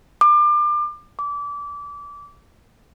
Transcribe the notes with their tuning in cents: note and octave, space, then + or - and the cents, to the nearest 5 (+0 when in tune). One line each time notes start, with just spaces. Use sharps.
D6 +30
D6 -25